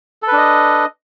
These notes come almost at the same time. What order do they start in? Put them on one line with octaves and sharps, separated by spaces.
A4 B4 D4 D#5